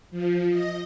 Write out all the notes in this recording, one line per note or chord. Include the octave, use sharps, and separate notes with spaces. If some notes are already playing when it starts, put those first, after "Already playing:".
F3
D#5